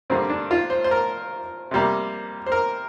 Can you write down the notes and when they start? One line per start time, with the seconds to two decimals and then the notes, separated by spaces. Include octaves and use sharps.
0.10 G2 D3 G3 A#3 C4
0.30 D4
0.51 F4
0.70 C5
0.84 C5
0.91 A#4
1.71 C3 G3 A#3
2.46 C5
2.52 A#4